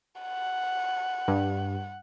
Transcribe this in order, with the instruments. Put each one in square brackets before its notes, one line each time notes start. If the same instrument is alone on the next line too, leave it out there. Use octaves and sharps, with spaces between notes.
[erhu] F#5
[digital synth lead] G2